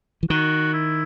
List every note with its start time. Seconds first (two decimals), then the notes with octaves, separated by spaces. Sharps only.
0.23 E3
0.30 D#3 F#4
0.73 E4